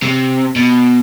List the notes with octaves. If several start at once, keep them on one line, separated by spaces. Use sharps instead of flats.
C3
B2